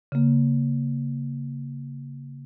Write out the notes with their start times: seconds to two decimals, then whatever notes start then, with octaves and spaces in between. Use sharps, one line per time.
0.12 C#3 A#3